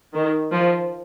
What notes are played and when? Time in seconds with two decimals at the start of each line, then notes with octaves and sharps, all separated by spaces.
0.14 D#3
0.53 F3